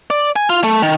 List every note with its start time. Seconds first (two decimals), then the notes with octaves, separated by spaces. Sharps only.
0.10 D5
0.36 G#5
0.50 F4
0.64 A3
0.82 D#3